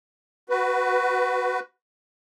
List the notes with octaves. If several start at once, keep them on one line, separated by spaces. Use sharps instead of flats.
F#4 B4